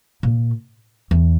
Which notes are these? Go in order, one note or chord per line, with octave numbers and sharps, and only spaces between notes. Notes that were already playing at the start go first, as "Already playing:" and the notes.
A#2
E2